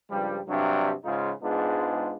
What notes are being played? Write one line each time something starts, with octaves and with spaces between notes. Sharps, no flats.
C#2 G2 F3 G3
G2 C3 F#3 D4
G#2 C#3 D#4 F4
G#2 G#3 B3 D4 F4